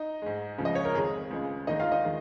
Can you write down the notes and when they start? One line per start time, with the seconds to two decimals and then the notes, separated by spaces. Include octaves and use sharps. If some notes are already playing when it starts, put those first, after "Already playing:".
Already playing: D#4 D#5
0.22 G#2 G#3
0.58 C#2 C#3 F3
0.65 D#5
0.75 C#5
0.85 A#4
0.94 F2 D#3 G#3 G#4
1.31 C#2 C#3 G#3
1.67 D#2 D#3 G#3 D#4 D#5
1.80 F4 F5
1.91 D#4 D#5
2.04 D#3 G#3